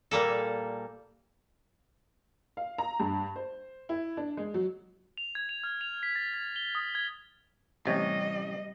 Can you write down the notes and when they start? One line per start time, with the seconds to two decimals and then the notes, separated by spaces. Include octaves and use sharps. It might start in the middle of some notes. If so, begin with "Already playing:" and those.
0.11 A#2 G3 A#3 A4
2.57 F5
2.78 A#5
3.00 G2
3.36 C5
3.89 E4
4.17 D4
4.37 G#3
4.54 F#3
5.17 F7
5.35 G#6
5.49 F7
5.64 F6
5.81 F7
6.03 B6
6.15 A6
6.34 A6
6.56 G7
6.75 D#6
6.95 G#6
7.86 A1 C3 G3 C#5 D#5